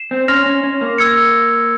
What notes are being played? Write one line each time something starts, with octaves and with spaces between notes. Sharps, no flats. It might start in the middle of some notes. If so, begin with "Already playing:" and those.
Already playing: C7 E7
C4
C#4 C6 F6 A#6 F7
C#4
C#4
A#3
E6 G#6 C#7